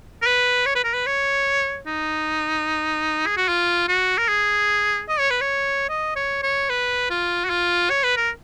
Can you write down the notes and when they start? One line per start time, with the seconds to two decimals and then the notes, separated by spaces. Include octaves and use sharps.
0.22 A#4
0.26 B4
0.66 C#5
0.75 B4
0.84 A#4
0.94 B4
1.06 C#5
1.87 D#4
3.26 G#4
3.37 F#4
3.48 F4
3.88 F#4
4.18 A#4
4.28 G#4
5.09 D#5
5.19 C#5
5.30 B4
5.41 C#5
5.89 D#5
6.16 C#5
6.43 C#5
6.70 B4
7.10 F4
7.45 F#4
7.50 F4
7.90 C#5
8.04 B4
8.17 A#4